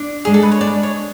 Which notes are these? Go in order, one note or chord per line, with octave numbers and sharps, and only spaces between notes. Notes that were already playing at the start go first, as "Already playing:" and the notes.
Already playing: D4
G#3 G#4
A4
B4
C#5
D4 D5
C#5